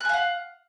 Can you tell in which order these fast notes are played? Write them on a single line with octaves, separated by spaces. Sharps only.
F#6 G#5 F5 F#5